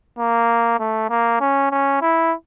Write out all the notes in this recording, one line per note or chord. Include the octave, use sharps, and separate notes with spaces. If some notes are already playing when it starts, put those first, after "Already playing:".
A#3
A3
A#3
C#4
C#4
E4